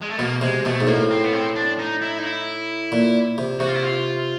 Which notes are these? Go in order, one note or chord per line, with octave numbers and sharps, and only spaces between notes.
G#3
A3
B2 A#3
C3 G#3
B2 A3
G#2
A2 A#3
C4
B3
C4
D4
D#4
E4
D#4
E4
A#2
C3
C3 F#4
F4
E4
F4